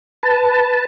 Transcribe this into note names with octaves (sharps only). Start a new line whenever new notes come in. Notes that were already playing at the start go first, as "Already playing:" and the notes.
B4 A5